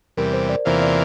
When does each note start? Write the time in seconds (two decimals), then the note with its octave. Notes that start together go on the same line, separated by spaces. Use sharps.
0.17 E2 C3 G3 A#4
0.33 C5
0.49 D5
0.65 E2 C3 E3 A#3 F4 C5
0.82 D5